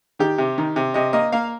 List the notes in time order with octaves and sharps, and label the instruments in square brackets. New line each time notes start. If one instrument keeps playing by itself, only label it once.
[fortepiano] D#3 G4
C3
D#3
C3
C3 D#5
A#3 D#5
A#3 F5